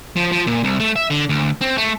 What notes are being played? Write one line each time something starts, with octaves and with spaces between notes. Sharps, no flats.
F3
F3
A#2
C2
A3
E5
D3
D2
C4
A3